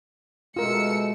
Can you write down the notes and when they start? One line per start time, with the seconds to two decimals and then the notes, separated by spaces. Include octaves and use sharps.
0.56 B2 G#3 A3 F4 A#4 E6 C#7